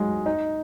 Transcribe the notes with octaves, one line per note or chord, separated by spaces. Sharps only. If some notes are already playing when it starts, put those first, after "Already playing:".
Already playing: F#3 G#3 D#4
D#4